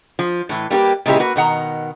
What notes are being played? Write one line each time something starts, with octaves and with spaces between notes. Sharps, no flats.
F3
A2 E3
G3 A#3 F#4 G4 B4
A#2 C#3 G#3 E4 G4 B4
A#3 F#4 B4
B2 D#3 F#5 A#5